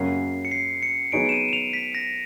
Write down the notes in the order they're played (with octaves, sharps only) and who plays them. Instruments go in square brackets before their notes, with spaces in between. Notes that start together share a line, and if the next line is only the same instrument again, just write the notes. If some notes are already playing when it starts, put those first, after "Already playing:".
Already playing: [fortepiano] F#2 C#3 F#3 A#3 C#4 [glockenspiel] C7
[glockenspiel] C#7
C7
C#7
[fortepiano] F#3 B3 D#4 G#4 C#5 [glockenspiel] D7
[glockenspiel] E7
D#7
E7
F7
B6
A#6